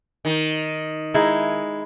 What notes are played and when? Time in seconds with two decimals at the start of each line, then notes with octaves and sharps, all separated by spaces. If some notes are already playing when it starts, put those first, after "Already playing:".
0.25 D#3
1.14 G#3 D#4 E4